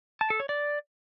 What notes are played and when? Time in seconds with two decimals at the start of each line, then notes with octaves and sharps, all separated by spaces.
0.21 A5
0.30 A4
0.40 C#5
0.49 D5